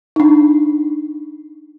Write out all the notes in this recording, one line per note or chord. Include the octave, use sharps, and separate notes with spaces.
D4 D#4